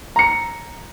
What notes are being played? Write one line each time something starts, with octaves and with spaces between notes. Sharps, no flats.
A#5 C#7